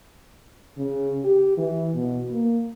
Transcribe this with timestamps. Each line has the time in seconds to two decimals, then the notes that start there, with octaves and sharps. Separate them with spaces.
0.78 C#3
1.24 G4
1.57 E3
1.94 B2
2.31 A#3